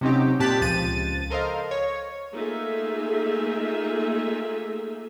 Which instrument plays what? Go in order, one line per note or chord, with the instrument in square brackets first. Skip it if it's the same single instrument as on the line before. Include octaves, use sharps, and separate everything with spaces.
[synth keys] C3 F#3 C4 C#4 D#4 G4
A#2 C4 G4 A5 F#6 B6
C#2 F3 A6 D#7
A4 A#4 C5 D#5 F5
C#5
[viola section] A3 A#3 D#4 F4 G#4 E5